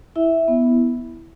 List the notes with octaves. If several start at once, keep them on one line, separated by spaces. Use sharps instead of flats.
E4 E5
B3